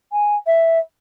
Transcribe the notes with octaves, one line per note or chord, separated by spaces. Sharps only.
G#5
E5